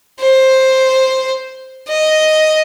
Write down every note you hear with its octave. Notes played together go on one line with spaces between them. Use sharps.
C5
D#5